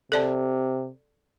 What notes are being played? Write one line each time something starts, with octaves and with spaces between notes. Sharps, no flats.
C3 A4 D5 A5